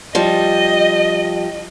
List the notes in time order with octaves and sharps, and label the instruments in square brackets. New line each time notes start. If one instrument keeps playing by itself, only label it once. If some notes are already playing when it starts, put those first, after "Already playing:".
[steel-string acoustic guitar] F3 G3 [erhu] D#5